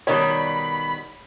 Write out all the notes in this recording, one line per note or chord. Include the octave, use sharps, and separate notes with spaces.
B2 D#3 G3 C#5 B5